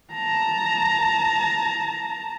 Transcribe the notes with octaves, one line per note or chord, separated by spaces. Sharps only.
A5 A#5